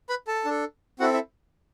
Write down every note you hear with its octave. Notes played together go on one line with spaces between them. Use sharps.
B4 B5
A4 A5
D4 A4
C4 E4 F#4 A4 F#5
E4 E5